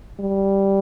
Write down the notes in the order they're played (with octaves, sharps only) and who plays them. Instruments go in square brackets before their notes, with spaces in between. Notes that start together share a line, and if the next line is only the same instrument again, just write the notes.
[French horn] G3